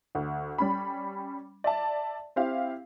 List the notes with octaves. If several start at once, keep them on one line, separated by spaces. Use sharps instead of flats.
D2
G3 C#4 B5
D5 E5 A5
C4 E4 G4 F5